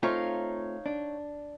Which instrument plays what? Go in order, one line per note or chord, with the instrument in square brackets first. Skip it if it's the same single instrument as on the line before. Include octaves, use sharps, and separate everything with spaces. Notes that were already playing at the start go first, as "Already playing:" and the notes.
[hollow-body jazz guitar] A3 C4 F4 [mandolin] D#4 C#5 F5
[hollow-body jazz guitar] D4